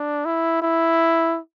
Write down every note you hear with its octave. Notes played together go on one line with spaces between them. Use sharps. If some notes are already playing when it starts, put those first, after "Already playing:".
Already playing: D4
E4
E4